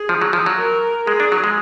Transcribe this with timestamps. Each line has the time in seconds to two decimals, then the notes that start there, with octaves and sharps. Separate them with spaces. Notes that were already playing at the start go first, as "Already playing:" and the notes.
Already playing: G#4
0.09 F3
0.21 F#3
0.33 F3
0.46 F#3
0.58 A#4
1.07 G#3 G#4
1.20 D4
1.32 F#3
1.44 G#3